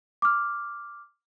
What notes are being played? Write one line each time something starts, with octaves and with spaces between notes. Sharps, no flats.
D6 F6